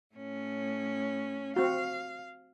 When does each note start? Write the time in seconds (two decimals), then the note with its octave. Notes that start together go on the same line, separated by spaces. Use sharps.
0.15 A2 C#4
1.56 C4 F#4 F5